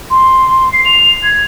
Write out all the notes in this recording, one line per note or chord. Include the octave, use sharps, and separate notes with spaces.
C6
C7
F7
G#6